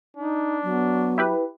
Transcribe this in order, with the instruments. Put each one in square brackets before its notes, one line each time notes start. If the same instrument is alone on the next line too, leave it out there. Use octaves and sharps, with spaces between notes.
[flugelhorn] D4 [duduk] D#4
[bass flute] F#3 [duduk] B3
[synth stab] E4 G4 B4